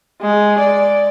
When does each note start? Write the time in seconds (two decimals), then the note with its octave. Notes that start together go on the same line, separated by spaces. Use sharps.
0.22 G#3
0.59 D5